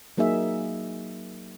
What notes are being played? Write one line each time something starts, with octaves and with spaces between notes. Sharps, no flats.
F#3 A#3 D#4 G#4 E5